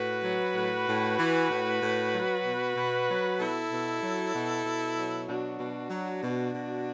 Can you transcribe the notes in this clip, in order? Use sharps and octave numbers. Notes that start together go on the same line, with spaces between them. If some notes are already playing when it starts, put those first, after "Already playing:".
Already playing: A2 F#4 B4
F#3
A2
A2
E3
A2
A2
F#3
B2
B2
F#3
B2 E4 A4
B2
F#3
B2
B2
F#3
B2 D4 F#4
B2
F#3
B2
B2